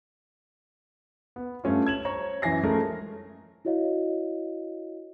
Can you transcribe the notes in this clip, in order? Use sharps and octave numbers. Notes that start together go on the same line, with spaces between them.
B3
G2 A3 C#4 F4
G#6 E7 F#7
C5 C#5 A#5 C#6
F#2 E3 E5 G#5 A#6 C7
F3 G#3 A3 C#4 A4 A#4
E4 F#4 C#5 D#5 F5